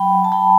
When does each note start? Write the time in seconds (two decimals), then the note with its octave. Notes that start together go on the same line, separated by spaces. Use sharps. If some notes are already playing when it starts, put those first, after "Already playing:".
Already playing: F#3 G5 B5
0.13 F#3
0.24 A5
0.32 F#3 G5 B5